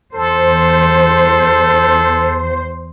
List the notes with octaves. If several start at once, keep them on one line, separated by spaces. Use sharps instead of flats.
E2 A4 C5